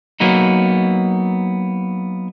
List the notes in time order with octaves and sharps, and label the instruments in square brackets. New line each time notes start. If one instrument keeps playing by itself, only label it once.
[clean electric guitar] F#3 A#3 B3 D#4